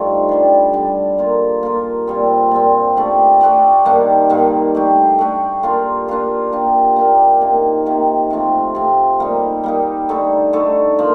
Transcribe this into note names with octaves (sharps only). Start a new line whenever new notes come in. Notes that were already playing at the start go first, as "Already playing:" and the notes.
Already playing: G2 F3 A3 D#4
D3 G3 D4
D3 G3 D4
A#3 F4 A#4
A#3 F4 A#4
A#2 G3 C4
A#2 G3 C4
A3 D4 G4 D5
A3 D4 G4 D5
G2 D#3 A#3 D4
G2 D#3 A#3 D4
A3 D4 G4
A3 D4 G4
A#3 D4 F4 A#4
A#3 D4 F4 A#4
A#3 D4 G4 A#4
A#3 D4 G4 A#4
C3 D#3 A#3
C3 D#3 A#3
C3 F3 A3
C3 F3 A3
G3 A#3 D#4
G3 A#3 D#4
D3 A3 D#4 A4
D3 A3 D#4 A4
F3 A#3